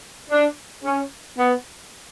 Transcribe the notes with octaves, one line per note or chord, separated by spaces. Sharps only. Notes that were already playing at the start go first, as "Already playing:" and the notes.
D4
C#4
B3